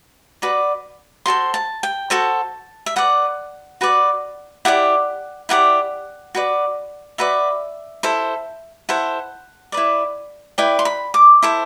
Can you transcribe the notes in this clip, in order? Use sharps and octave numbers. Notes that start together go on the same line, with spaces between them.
F#4 B4 D5
F#4 A4 C5 C6
A5
G5
F#4 A4 C5 A5
E5
F#4 B4 D5 F#5
F#4 B4 D5
E4 G4 B4 D5 F#5
E4 G4 B4 D5 F#5
F#4 B4 D5
F#4 B4 D5 E5
E4 A4 C5
E4 A4 C5 F#5
E4 B4 D5
E4 B4 D5 G5
C6
B5
D6
E4 A4 C5